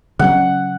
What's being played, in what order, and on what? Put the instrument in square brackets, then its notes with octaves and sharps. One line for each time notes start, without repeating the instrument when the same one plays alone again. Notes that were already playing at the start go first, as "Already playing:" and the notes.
[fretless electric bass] C#3 F#3 C#4 [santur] F#5